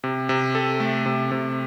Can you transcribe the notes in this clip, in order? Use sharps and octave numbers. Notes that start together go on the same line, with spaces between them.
C3
C3
A4
A3
C3
C3